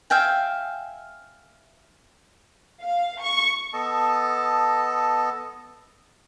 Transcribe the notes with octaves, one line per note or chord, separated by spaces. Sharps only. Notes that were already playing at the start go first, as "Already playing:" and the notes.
E5 F5 G5 G#5
F5
C#6
B3 A4 D#5 A5